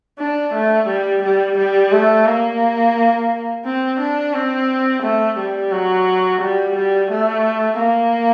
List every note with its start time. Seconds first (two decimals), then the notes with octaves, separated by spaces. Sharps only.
0.19 D4
0.54 A3
0.88 G3
1.22 G3
1.57 G3
1.92 A3
2.26 A#3
3.65 C4
4.00 D4
4.34 C4
5.03 A3
5.38 G3
5.72 F#3
6.41 G3
6.75 G3
7.10 A3
7.79 A#3